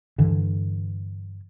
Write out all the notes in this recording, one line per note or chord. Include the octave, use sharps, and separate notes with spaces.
G2 D3 E3